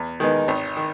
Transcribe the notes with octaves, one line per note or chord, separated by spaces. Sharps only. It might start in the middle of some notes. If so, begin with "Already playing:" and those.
Already playing: E2
D#3 G#3 B3 D#4
G#1
D#3